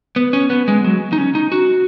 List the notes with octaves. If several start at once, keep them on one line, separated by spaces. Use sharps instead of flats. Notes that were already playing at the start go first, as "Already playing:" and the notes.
B3
C#4
B3
G#3
F#3
D#4
C#4
D#4
F#4